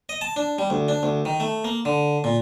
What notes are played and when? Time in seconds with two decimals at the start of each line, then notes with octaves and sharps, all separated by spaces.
0.09 D#5
0.21 A5
0.36 D4
0.58 G3
0.70 D2
0.88 D4
1.03 D2
1.25 D#3
1.40 A3
1.65 A#3
1.85 D3
2.24 A#2